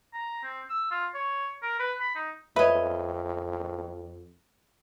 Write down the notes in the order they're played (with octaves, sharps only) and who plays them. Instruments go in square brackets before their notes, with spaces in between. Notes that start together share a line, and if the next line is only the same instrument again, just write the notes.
[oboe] A#5
C4
E6
F4
C#5
A#4
B4
B5
D#4
[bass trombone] F2 [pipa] B4 D#5 [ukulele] C#5 E5